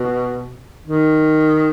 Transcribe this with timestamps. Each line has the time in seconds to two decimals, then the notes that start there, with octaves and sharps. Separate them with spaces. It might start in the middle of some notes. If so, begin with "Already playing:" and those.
Already playing: B2
0.88 D#3